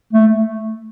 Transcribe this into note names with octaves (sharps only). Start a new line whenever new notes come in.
A3